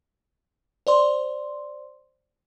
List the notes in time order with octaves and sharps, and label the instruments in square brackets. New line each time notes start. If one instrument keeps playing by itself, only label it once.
[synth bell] C5 D5 C6